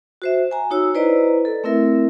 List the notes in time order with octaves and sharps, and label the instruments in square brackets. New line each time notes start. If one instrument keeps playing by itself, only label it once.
[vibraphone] F#4 C5 E5
G#5 A#5
D#4 F#4 C#5 E6
E4 B4 C5 D5 D#5 A#5
A4
A3 C4 E4 A#4 E5